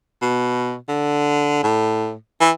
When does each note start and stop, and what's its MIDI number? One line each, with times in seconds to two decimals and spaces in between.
0.22 0.76 47
0.89 1.60 50
1.63 2.14 45
2.40 2.51 52